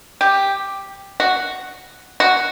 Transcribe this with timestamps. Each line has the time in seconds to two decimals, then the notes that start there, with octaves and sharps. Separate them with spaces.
0.21 G4
1.20 F#4
2.20 F#4